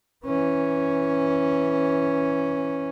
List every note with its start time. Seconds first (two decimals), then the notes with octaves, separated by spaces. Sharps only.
0.26 E3 C#4